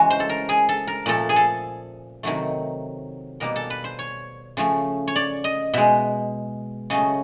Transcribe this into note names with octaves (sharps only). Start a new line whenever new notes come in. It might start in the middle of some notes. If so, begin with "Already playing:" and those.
Already playing: C#3 E3 G#3 F#4
C5
A4
A#4
G#4
A4
A#4
A#2 F3 A3 A4
G#4
A4
C3 D#3 F#3 A3
B2 G3 A#3 A#4
A4
B4
C5
C#5
C#3 F3 A3
C#5
D5
D#5
B2 G#3 E5
C#3 F#3 A3 D#5